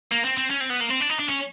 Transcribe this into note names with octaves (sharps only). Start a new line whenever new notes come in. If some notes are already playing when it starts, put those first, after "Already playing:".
A#3
C4
C4
C#4
C4
B3
A#3
C4
D4
D#4
D4
C#4